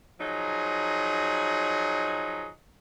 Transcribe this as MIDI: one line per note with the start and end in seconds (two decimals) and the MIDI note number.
0.20 2.49 53
0.20 2.49 54
0.20 2.49 63
0.20 2.49 68